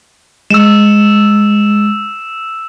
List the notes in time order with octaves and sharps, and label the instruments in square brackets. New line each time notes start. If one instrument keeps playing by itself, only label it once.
[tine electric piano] G#3 [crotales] E6 E7